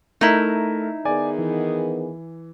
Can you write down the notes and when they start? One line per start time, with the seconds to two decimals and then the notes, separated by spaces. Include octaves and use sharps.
0.21 A3 D#4 E4 A#4
1.05 D#3 B3 G#4 D5 G#5
1.38 E3